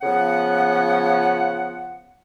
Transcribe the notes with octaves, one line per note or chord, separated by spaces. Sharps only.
C#3 F3 B3 F#5